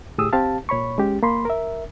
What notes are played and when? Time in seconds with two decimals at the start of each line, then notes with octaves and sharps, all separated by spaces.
0.18 D2 A2 G4 G#4 D#6 E6
0.33 C4 G4 F5 A5
0.69 A#2 C#5 B5 C#6
0.98 G#3 C#4 G4
1.23 A#3 B5 C6
1.45 A#4 E5